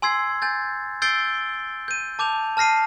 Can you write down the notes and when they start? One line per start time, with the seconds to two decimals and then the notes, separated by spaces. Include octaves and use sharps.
0.02 G#5 C6 E6 G#6 C7
0.42 G#5 G6 A6
1.02 E6 G6 A6 C7 D7 G7
1.88 G6 D#7
2.19 A5 D6 G6 F7
2.57 A5 F6 A#6 C7 D#7